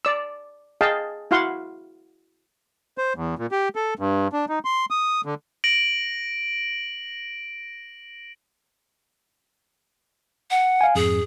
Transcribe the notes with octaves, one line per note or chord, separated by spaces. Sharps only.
D5 E6
G#4 D#5 F5 G5 A5
E4 F#4 F5 F#5 C6
C5
E2
A#2
G4
A4
G2
D4
D#4
C6
D#6
D3
A#6 D7 F#7
F#5
F5 G#5
F2 G#2 G#4